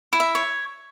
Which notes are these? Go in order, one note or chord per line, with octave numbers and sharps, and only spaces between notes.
E4
E5
C#5